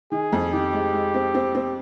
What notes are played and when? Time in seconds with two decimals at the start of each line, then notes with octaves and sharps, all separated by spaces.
0.11 D#3 G#4
0.32 F2
0.53 D#3 G4
0.73 G#3
0.93 G#3
1.14 C4
1.35 C4
1.55 C4